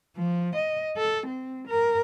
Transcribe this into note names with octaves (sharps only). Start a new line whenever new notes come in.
F3
D#5
A4
C4
A#4